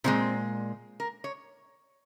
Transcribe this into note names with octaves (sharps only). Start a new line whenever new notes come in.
A#2 F3 G#3 C4
A#4
C#5